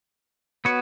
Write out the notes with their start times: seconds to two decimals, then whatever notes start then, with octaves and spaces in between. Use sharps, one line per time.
0.65 B3 F#4 C#5